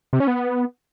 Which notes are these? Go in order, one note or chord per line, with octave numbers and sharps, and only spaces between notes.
C3
C#4
B3